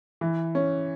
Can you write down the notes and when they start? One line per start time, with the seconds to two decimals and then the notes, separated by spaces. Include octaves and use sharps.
0.21 E3
0.55 C#4